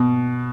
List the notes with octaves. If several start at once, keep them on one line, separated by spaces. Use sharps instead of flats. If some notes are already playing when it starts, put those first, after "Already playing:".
Already playing: B2